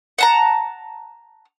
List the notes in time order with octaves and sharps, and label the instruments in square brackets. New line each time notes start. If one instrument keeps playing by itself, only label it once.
[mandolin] F#5 A5 A#5